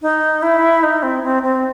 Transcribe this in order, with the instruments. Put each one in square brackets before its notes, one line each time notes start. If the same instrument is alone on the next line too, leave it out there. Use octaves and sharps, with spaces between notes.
[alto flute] D#4
E4
D#4
C4
C4
C4